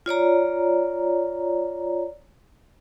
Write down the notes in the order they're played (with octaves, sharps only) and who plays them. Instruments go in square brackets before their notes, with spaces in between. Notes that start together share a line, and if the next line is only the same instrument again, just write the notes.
[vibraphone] F4 C#5 D5 A#5